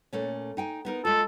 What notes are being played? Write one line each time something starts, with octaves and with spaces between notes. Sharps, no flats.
A#2 A3 C#4
D#4 G5 G#5
B3 D#4 A#4
G#3 F4 A4